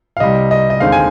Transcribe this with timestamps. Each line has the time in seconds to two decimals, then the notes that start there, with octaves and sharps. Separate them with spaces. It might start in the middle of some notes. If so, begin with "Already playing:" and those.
0.17 F5
0.20 C2 C3 G3 D#5
0.51 D#5
0.70 D#5
0.80 D#2 D3 G#3 C4 D#4 F5
0.92 G#5